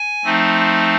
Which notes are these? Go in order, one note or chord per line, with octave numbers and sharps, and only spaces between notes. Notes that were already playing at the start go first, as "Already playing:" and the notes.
Already playing: G#5
F3 A3 C4 D#4